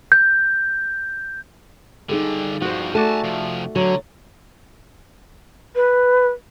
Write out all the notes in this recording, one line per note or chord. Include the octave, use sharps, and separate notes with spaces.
G6
G2 D3 D#4 G#4 A4
G2 F3 F#4 C5
A3 F#4 A4 D5 G#5 A5
C3 F3
D3 F#3
B4